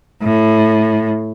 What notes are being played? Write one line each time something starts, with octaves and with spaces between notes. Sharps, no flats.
A2